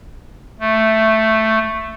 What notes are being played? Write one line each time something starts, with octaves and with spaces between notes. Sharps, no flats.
A3